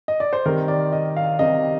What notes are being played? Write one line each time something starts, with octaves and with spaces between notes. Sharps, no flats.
D#5
D5
C5
C3 D#3 G3 A#4
D5
D#5
F5
C3 D#3 G3 D#5